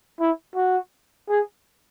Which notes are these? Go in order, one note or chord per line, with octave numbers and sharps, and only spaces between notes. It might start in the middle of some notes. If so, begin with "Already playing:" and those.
E4
F#4
G#4